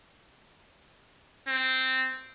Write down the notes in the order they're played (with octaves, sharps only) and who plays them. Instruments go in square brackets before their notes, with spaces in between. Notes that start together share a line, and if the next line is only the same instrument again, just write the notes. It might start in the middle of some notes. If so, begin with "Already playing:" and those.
[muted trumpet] C4